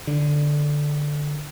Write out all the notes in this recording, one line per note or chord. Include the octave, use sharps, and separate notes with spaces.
D3